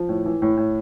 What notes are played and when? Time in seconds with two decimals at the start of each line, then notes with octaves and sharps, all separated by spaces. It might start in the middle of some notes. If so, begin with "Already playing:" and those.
Already playing: F3
0.09 A2
0.26 E3
0.42 A2
0.57 A2